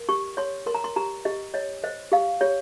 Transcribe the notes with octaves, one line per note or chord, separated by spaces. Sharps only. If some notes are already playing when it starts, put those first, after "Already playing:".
Already playing: A#4
G4 C#6
C#5 C6
A#4 C6
A#5
C6
G4 A#5
G4 D#5
C#5 D#5
C5 D#5
G4 F5
G4 C#5